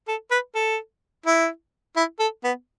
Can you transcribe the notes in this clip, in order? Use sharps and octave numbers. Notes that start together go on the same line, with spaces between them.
A4
B4
A4
E4
E4
A4
B3